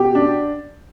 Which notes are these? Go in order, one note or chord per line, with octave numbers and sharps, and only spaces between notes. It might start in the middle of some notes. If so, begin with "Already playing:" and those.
Already playing: B2 G4
D4